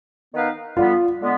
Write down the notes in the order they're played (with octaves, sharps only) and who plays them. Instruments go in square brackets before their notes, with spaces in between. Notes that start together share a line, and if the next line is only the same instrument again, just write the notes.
[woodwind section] D#3 B3 D#4 B4 F5
[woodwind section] D3 G3 B3 [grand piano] F4
[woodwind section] D3 G#3 B3